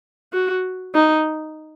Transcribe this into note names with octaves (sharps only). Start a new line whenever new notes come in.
F#4
D#4